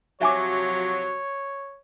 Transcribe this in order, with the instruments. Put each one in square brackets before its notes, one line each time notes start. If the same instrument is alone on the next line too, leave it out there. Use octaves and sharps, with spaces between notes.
[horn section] C3 F3 F#3 [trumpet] C#5 [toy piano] E5 G#5 D6